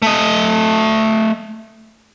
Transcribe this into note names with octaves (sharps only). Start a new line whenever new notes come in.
A3 D#5